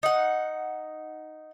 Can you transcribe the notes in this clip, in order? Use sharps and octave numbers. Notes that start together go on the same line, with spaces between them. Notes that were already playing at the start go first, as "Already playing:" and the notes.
D#4 F#5